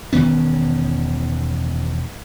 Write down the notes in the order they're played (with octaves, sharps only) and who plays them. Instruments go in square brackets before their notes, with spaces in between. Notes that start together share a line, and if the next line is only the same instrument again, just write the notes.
[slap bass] E1 D#3 B3 C#4